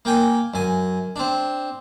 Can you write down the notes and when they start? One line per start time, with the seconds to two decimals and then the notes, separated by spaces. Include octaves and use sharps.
0.05 A#3 G5 G#5
0.54 F#2 G#5
1.16 C4 D4